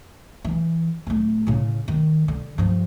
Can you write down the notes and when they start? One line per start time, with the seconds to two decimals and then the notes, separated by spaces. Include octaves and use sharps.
0.45 E3
1.07 D1 A3
1.47 A2 C#3
1.88 D#3
2.28 D3
2.58 G2 F3